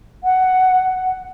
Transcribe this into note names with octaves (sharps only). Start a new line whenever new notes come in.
F#5